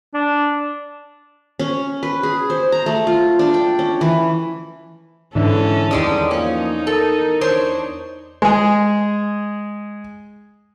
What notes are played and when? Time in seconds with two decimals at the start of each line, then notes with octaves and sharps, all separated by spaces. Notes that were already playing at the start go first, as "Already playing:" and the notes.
0.14 D4
1.59 C#4
2.03 B4
2.23 G#4
2.50 C5
2.72 A#5
2.86 A3
3.07 F4
3.39 D4
3.54 G5
3.79 C#4
4.01 E3
5.35 G#2 D3 E3 C#4 A4
5.91 E2 D#3 G3 G#3 D4 D5 D#6
6.31 F3 A#3 C#4 D#4
6.87 A4 A#4
7.41 D4 C5 C#5
8.42 G#3 G#4